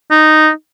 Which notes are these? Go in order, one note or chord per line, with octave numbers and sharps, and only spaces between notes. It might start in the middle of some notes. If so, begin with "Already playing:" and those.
D#4